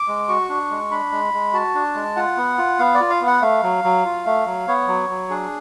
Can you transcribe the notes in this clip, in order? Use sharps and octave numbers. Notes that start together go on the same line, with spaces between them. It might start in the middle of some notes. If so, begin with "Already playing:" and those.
Already playing: D6
G#3
F#4 C#6
D4
G#3
D4 B5
G#3
G#3
F#4 A5
D4
G#3
F4 F#5
B3
F4
B3 F5
D5
F4
F5
B3
F#5
A3 F5
F#3
F#3
F4
A3
F#3
B3 C#5
F#3
F#3
D4 G#4